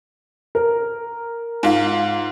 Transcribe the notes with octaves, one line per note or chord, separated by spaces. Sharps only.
A#4
G#2 F4